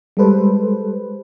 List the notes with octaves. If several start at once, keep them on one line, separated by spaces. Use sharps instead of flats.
G3 G#3 A4 B4 C5